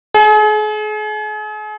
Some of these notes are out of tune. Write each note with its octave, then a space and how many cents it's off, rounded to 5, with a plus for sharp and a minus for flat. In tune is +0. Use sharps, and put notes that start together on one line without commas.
G#4 +40